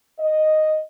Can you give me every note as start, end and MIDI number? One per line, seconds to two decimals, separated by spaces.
0.19 0.78 75